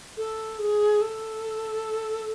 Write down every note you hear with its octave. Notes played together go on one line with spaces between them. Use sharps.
A4
G#4
A4